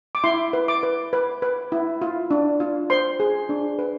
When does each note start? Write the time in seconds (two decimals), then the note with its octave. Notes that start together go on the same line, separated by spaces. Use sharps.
0.15 D6
0.24 E4 C6
0.53 B4
0.68 D6
0.83 B4
1.13 B4
1.42 B4
1.72 E4
2.02 F4
2.31 D4
2.60 F4
2.90 C5 C6
3.20 G#4
3.49 D4
3.79 B4